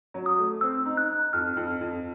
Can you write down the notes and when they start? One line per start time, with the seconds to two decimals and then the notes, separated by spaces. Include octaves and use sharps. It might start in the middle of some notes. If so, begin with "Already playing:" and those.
0.14 F#3
0.26 D#6
0.38 A3
0.61 C4 E6
0.86 D#4
0.97 F#6
1.10 D#4
1.33 F2 F6
1.57 F2
1.81 F2